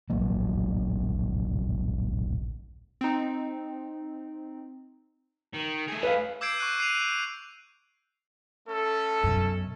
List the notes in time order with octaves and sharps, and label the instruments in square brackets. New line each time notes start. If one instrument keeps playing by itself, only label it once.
[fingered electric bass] D1 A#1 F#3 A#3
[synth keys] C4 D#4
[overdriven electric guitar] D#3
A3 G#4
[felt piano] B4 F5
[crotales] D6 E6 G6 G#6 C7 D7
C#6 F#6 D#7
F#6 C7 D#7 F7
[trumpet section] A3 C#4 A4
[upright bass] F#2 B2